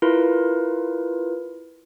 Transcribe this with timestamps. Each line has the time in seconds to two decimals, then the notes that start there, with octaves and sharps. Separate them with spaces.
0.02 E4 F4 A#4 B4